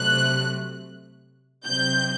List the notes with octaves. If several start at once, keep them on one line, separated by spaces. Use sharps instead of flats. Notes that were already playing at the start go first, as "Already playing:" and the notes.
Already playing: C3 F#3 A3 F#6
C3 F#3 C4 G6